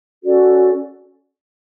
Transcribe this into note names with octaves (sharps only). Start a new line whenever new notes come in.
C#4 F#4 A4 D5